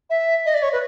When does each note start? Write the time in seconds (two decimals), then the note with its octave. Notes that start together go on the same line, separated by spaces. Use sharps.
0.10 E5
0.46 D#5
0.54 D5
0.63 C#5
0.72 B4